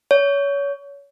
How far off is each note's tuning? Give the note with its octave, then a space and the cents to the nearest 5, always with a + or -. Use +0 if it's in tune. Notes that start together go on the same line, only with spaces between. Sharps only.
C#5 +25